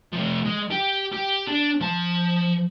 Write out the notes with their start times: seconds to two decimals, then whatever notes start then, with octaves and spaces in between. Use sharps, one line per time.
0.12 C3 F3
0.45 G#3
0.70 G4
1.13 G4
1.48 D4
1.81 F3 A5